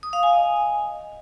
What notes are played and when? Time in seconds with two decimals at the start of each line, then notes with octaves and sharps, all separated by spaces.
0.03 D#6
0.13 F5
0.23 G#5
0.33 D#5